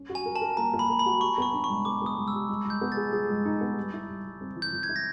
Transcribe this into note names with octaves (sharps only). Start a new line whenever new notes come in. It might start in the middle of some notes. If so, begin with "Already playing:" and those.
Already playing: C#4
F#4
G#5
A#4
A5
A#4
A#3 A#5
A#3
B5
A#4
B5
F#4
G4 C#6
B3 C#6
D4
C#6
G#3
B3 D6
B3 D#6
G#3
E6
G4
G#3
G#3
G6
B3
A6
G#4
G#4
G#3
D#4
B3
G3
E4
G3
G3
C4
E3
G6
E3
G#6
E4
A#6